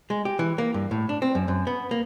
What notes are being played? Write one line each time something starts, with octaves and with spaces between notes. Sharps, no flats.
G#3
G4
E3
A#3
G2
A2
D4
C4
F#2
F#2
B3
A#3